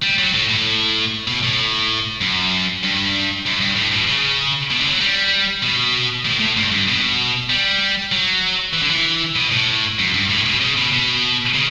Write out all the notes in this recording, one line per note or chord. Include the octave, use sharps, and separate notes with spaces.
G3
F#3
A2
A2
B2
A2
F#2
G2
F#2
G2
A2
B2
C#3
B2
D3
F#3
G3
B2
A2
A2
G2
G2
B2
G3
F#3
E3
D3
E3
B2
A2
F#2
G2
A2
B2
C#3
B2
B2
C#3